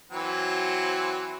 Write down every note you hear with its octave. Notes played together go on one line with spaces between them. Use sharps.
E3 F#3 C4